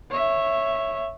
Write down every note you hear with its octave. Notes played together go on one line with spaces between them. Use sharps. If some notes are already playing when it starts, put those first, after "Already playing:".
C#5 E5